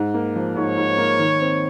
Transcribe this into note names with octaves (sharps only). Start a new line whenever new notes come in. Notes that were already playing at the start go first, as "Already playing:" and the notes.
Already playing: G#2
A#3
F3
G#2 C#5
G#2
A#3
D#3
C4